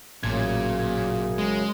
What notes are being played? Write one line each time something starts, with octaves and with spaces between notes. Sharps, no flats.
A1 F#2 A#2 C#3 G#6
G#3